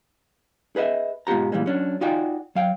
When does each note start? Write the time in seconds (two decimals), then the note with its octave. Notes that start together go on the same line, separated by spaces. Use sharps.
0.76 G#4 B4 D#5 E5
1.27 G#2 B2 F4 G4 A#5
1.52 A#2 E3 G3 G#3
1.66 F#3 C#4 D4
2.01 D#4 F4 F#4 D5 G5 G#5
2.55 F#3 F5 G5